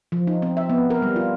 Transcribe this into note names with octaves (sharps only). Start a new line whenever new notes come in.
F3
D#4
C4
E5
B3
A#4
G3
F4